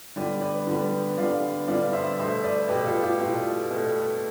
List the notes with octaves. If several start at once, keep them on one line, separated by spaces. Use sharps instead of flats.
D3 G3 B3 B4 D5
B4 D5
D3 G3 B3
D3 G3 B3 D5 F5
D3 G3 B3 D5 F5
C5 E5
B2 A3 C5 E5
B4 D5
B2 A3 G4 B4
F4 A4
E4 G4
B2 A3 F4
B2 A3